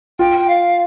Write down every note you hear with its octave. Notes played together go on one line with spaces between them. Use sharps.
F4 G5
G5
F5